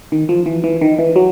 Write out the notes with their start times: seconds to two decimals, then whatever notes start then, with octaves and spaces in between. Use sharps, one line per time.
0.12 D#3
0.29 F3
0.46 E3
0.64 E3
0.81 D#3
0.99 E3
1.16 F#3